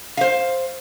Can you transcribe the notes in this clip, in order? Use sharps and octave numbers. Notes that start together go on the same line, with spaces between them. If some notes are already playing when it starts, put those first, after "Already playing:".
C5 F5